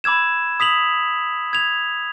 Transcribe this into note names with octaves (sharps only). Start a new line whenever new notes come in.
B5 D6 E6 G#6 E7
D#6 B6 F7 F#7
G#6 F7